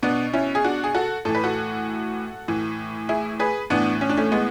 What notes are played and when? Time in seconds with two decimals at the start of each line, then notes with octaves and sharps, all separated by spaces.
0.03 B2 B3 D4
0.33 C#4 E4
0.55 G#4
0.64 D4 F#4
0.84 G#4
0.95 F#4 A4
1.25 A2 E3 A4
1.35 B4
1.44 F#4 A4
2.48 A2 E3
3.09 E4 G#4
3.40 G#4 B4
3.70 A2 E3 B3 D4
4.01 C#4
4.09 D4
4.17 A3 C#4
4.32 G#3 B3